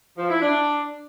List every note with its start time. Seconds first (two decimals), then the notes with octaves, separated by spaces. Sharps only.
0.18 F3
0.30 E4
0.42 D4